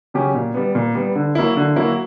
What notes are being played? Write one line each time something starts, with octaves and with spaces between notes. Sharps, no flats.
C#3 F#3 C#4 G4
A#2
G3 B3
A#2
G3 B3
D3
F#3 A#3 E4
D3
F#3 A#3 E4